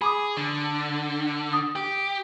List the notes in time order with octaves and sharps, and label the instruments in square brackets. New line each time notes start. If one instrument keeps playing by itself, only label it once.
[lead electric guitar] G#4 [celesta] B5 D6 D#6
[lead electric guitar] D3
[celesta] D#6
[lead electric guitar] G4